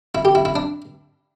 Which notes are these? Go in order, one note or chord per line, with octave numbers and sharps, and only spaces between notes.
E4
G4
E4
E4
D4